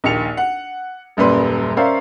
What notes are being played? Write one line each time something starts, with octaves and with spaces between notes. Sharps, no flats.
A#1 D#2 C#7 F7
F#5
D#1 F#2 A#2 G3 B4 C6
C#4 A#4 C5 D5 E5 F5